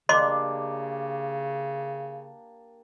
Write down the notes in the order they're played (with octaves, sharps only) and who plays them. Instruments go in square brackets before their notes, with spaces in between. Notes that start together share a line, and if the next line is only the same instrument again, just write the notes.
[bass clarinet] C#3 [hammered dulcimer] A#3 D4 G4 [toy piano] D#5 C6 D6